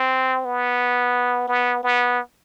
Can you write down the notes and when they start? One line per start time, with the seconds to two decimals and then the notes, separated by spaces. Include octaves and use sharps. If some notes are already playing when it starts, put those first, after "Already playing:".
Already playing: C4
0.45 B3
1.48 B3
1.83 B3